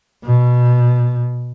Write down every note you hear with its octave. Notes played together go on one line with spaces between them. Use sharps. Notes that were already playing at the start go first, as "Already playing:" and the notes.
B2